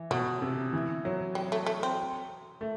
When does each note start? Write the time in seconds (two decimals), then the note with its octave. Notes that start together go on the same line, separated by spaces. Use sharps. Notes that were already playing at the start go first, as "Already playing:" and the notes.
Already playing: E3
0.11 B2 F#3
0.42 C3
0.73 E3
1.05 F#3
1.35 G3
1.52 A3
1.66 A3
1.83 C4
2.61 A3